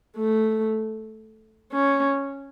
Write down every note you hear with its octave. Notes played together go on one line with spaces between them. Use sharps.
A3
C#4